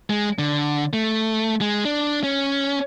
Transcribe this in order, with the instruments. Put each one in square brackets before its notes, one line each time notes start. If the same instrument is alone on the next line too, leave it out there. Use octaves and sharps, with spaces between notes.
[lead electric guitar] G#3
D3
A3
G#3
D4
C#4